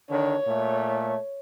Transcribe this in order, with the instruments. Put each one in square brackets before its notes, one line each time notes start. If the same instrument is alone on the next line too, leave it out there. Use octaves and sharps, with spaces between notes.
[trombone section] D3 D#3 D4 [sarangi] C#5
[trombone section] A#2 A3